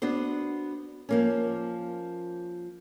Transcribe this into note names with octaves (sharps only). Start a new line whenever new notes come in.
B3 D4 F#4 C5
F3 A#3 C#4